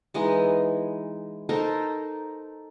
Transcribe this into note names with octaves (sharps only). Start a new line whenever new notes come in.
E3 G#3 B3 D#4
D#4 A4 A#4 C5